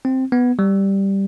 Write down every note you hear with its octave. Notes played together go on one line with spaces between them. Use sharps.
C4
B3
G3